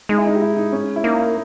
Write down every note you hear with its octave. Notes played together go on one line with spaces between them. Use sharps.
G#3 D#4
E4
D#4
G4
E4
D#4
C#4
E4
A#3 D#4